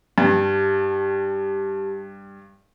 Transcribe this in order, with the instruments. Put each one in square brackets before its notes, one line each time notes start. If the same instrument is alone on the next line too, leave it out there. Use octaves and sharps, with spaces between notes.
[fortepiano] G2 [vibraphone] G4 A5 B5